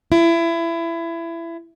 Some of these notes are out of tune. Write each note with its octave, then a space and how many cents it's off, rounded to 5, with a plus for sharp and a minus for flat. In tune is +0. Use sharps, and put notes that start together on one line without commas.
E4 +25